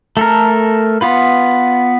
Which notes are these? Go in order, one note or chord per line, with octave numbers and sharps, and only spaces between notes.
A3 A4 A#4
B3 F4 B4